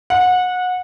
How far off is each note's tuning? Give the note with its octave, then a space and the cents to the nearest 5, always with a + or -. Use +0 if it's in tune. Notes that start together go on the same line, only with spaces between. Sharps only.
F#5 -25